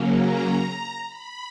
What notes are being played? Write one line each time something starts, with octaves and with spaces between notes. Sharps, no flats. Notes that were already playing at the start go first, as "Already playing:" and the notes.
Already playing: C#3 F#3 A#3 C#4
A#5
B5